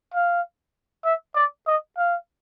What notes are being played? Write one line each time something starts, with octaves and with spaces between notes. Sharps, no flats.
F5
E5
D5
D#5
F5